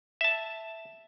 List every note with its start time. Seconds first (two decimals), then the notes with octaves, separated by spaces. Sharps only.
0.21 E5 A5